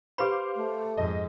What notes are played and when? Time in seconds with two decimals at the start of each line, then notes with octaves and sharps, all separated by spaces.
0.18 G4 B4 C5 F5 B5 D6
0.56 A3
0.97 F2 G#2 D#5